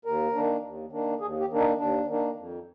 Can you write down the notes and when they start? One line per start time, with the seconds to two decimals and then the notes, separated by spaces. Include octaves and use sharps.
0.05 D#2 A#4
0.35 D#3 A#3 D4
0.63 D#2
0.92 D#3 A#3 D4
1.20 D#2 G#4
1.40 G4
1.50 D#3 A#3 D4
1.59 D#4
1.78 D#2 D4
2.07 D#3 A#3 D4
2.36 F2